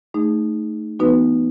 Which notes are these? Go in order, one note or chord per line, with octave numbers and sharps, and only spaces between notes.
A3 D#4 G#4
E3 B3 D#4 F#4 B4